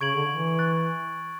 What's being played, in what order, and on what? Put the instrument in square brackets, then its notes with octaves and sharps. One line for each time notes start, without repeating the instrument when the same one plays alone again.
[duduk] C#3 [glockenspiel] C#6 G#6 D7 F#7
[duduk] D3
E3
[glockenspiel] C#6 F#6 A6